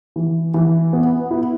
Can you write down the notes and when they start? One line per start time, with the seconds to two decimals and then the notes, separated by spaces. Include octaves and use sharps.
0.16 E3
0.54 E3
0.93 B3
1.31 E4